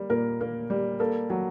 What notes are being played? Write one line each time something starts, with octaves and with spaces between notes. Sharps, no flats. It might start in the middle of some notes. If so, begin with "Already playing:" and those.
Already playing: G3 A#3
A#2 A#4
A#3
G3
A#3 A4
F#3